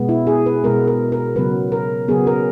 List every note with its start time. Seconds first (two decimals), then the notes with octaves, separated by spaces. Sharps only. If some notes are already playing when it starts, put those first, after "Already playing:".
Already playing: B2 G#3 B3
0.09 E4
0.27 G#4
0.46 B4
0.64 B2 G#3 B3 A#4
0.87 A#4
1.12 A#4
1.36 C#3 F#3 B3 B4
1.72 A#4
2.08 C#3 F#3 B3 G#4
2.27 A#4